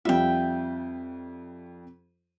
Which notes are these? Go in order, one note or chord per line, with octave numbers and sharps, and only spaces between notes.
F2 G3 F4 E5 G5